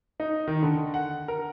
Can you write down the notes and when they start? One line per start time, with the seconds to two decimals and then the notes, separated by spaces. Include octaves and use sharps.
0.20 D#4
0.48 D#3
0.63 D3
0.94 F#5
1.28 A#4